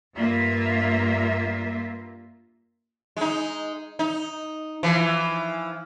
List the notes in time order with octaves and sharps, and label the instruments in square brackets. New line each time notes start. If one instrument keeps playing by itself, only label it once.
[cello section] G2 A#3 F4 E5
[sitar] G#3 D#4
D#4
E3 F3